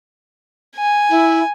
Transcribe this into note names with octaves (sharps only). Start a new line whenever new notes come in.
G#5
E4